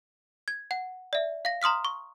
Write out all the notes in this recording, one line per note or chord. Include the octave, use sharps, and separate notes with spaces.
G#6
F#5
D5 E5
F5 A#6
A#5 C6 D#6 F6 B6
C#6